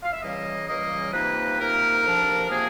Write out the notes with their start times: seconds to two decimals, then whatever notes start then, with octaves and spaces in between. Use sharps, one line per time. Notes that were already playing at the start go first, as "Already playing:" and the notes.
0.03 F5
0.12 E5
0.22 C#2 C#3 E3 G3 A#3 D#5
0.67 C#2 C#3 E3 G3 A#3 D#5
1.13 C3 F3 A#3 D#4 B4
1.58 C3 F3 A#3 D#4 A#4
2.04 D2 C3 F3 A#3 D4
2.49 C3 F3 A#3 D4 G#4